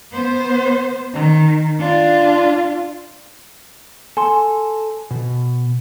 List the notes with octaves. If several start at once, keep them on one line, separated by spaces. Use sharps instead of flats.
B3 C5
D#3
D4 F4
A4 G#5 C6
B2